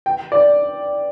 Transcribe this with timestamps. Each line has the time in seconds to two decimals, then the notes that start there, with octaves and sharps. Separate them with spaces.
0.06 G5
0.32 D5